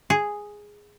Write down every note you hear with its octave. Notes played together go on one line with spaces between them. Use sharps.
G#4